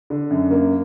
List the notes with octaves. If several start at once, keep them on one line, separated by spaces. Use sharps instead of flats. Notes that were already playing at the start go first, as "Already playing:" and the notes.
D3
F#2
A#3